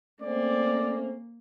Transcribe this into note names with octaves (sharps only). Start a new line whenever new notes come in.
A3 A#3 C4 C#4 D5